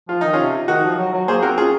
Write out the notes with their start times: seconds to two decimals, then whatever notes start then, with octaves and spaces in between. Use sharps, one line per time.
0.09 F3 F4
0.21 D#3 D#4
0.33 C#4 F4
0.39 C3
0.68 D#3 D#4 F#4
0.83 F3
0.98 F#3
1.13 F#3
1.28 A#3 G#4 C5
1.42 C4 F#4 A#4
1.58 C#4 F4 G#4